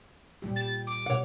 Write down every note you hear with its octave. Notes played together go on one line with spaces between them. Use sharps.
A#2 G3 G4
A6
D6
B2 C#5 F#5